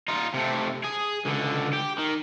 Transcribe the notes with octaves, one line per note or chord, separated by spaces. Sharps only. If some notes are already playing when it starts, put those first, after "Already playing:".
D#4 F4
C3 A3
G#4
C#2 D3
G4
D#3